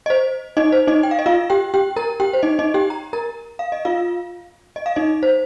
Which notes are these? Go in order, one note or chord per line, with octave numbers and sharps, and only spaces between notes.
D#5
C5
D#4 D#5
C5
D#4 D#5
G5
F5
D#5
F4 F5
G4 G5
G4 G5
A#4 A#5
G4 G5
C5
D#4 D#5
D#4 D#5
G4 G5
A#5
A#4 A#5
F5
D#5
F4 F5
D#5
F5
D#4 D#5
C5